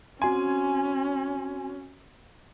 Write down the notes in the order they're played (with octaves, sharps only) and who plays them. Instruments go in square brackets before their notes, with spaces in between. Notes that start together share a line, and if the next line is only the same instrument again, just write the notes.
[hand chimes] C4 F#4 C6 [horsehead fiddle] C#4 [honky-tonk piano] G#5